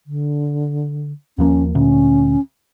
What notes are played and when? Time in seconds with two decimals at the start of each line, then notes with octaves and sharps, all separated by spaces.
0.06 D3
1.38 D#2 F3 A#3 C#4
1.75 D2 A#2 C#4